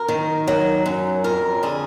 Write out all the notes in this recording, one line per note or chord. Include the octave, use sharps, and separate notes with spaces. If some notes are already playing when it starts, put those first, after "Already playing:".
Already playing: F#2 A#4
D#3
F#3
F#2
F2 A#4
D3 G#4